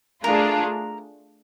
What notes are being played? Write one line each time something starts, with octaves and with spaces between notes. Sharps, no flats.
A3 D4 F4 G#4 A#4